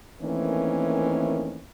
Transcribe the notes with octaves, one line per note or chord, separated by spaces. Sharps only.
D#3 E3 A3 A#3 C4 C#4